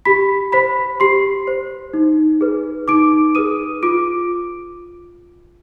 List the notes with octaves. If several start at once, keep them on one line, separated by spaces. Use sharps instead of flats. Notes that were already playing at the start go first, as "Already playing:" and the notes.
G4 B5 B6
C5 B5 B6
G4 C6 C7
C5
D#4
G#4 B4
D#4 D6 D7
G#4 B4 D#6 D#7
F4 D6 D7